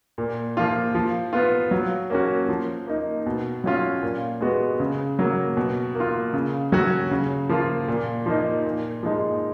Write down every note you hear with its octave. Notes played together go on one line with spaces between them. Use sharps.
A#2
F3 A#3 F4
F3
B3 F4
F#3
A#3 C#4 F#4
F3
A#3 D#4
B2
F#3 C#4 F4
A#2
G#3 B3 F#4
C#3
F#3 A#3
B2
A#3
F4
C#3
F#3 C#4 F#4
C#3
F3 A#3 F4
A#2
F3 A#3 D#4
A#2
F3 G#3 D#4